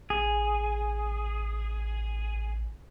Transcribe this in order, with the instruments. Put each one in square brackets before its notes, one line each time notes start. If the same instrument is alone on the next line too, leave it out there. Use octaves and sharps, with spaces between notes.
[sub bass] A1 [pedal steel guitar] G#4